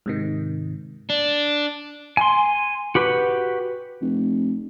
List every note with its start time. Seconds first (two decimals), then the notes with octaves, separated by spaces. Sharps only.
0.06 G#2 C3 D#3
1.10 D4
2.17 G#5 C6
2.95 F#4 G4 B4
4.01 F1